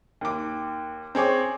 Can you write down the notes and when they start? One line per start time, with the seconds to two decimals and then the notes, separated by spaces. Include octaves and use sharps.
0.21 D#2 D6
1.15 C4 G#4 C#5 D6